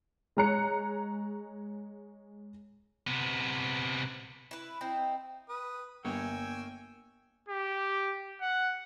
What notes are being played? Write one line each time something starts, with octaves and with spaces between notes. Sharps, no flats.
G#3 C#5 A#5 F#6 C#7
C3 B3
E4 B4
C4 D#4 E4
B4 D#6
G1 A#3 C#5 G5 G#5 E6
G4
F#5